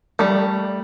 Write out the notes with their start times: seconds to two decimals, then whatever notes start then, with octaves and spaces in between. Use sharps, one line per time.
0.19 G3 A3